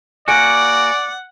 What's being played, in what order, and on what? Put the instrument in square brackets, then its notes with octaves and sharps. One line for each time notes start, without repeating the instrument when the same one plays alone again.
[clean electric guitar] A#3 F#4 [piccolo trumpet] D5 [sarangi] F#5 [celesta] G#5 D7